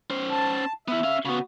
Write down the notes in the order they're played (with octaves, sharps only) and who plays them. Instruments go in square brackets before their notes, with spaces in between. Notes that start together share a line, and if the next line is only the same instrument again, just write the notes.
[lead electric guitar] C#4 C5
[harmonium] A5
[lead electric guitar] B3 E4 [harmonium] E5
[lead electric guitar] C#4 F5
[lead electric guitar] C#3 B3 [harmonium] F#4